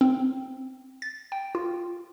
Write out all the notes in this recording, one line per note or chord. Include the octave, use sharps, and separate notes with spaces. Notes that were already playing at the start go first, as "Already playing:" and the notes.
C4
A6
G5
F4